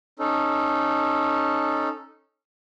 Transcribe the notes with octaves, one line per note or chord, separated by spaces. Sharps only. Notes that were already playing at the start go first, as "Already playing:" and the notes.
C#4 D#4 A4